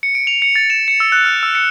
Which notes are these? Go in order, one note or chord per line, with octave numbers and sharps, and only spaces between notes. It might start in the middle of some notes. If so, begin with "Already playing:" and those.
C#7
D7
F7
C#7
A6
E7
C#7
E6
F#6
F6
E6
C#7